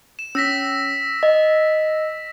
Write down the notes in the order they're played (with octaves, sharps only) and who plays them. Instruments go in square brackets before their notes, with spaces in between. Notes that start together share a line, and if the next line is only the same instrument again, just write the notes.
[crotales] E7
[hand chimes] C#4 [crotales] E6 A#6 B6
[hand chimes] D#5